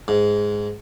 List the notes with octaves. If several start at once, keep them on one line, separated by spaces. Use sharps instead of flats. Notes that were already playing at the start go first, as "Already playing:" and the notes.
G#2